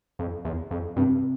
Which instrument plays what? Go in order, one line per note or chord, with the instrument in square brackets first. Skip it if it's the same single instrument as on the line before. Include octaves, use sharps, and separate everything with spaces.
[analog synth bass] F2
E2
F2
[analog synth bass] G2 [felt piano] C3